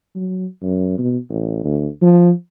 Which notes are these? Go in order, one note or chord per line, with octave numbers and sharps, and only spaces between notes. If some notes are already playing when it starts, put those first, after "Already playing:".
F#3
F#2
B2
A1
D2
F3